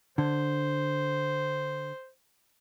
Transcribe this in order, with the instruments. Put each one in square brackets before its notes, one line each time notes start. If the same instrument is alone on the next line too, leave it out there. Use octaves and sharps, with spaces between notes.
[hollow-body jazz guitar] D3 [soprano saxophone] C5